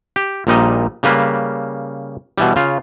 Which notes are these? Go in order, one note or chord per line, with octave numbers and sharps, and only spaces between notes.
G4
A#1 A#2 G3 D#4 D#5
C#3 G3 A#3 B4
B2 E3 G3
C#3 F4